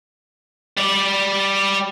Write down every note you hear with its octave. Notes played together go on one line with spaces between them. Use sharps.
G3 D5